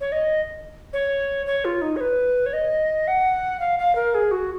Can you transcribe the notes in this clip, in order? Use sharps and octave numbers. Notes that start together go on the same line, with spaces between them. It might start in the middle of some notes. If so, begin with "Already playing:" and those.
C#5
D#5
C#5
C#5
F4
D#4
C#5
B4
C#5
D#5
F#5
F5
F5
A#4
G#4
F#4